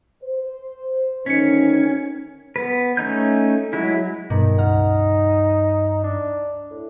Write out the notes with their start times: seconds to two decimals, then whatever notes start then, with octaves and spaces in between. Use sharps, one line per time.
0.23 C5
1.26 D2 D#3 C#4 D#4 B6 C#7
2.56 B3 B4
2.97 A3 C#4 D#4 G6
3.73 F#3 G#3 E4
4.30 G2 B2 D#3
4.58 C#2 D#4 F#5 F6
6.04 D4
6.70 A2